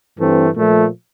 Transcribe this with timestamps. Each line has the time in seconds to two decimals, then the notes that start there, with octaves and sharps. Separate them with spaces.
0.17 G2 E3 A3 C4
0.56 A#2 F3 A3